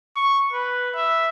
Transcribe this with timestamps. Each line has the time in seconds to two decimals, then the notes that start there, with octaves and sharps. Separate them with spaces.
0.16 C#6
0.53 B4
0.95 E5